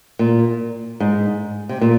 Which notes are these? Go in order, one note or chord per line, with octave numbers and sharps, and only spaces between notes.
A#2
G#2
C3
A#2